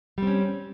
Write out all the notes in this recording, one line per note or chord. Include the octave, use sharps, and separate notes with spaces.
G3 C4 C#4